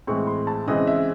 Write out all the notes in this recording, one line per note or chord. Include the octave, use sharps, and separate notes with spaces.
A2 E3 G#3 C4 C#6
C6
A5
C#3 E3 G#3 C4 D#5
E5